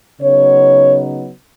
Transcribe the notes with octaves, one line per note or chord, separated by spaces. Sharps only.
C#3 F#3 B3 D#4 C#5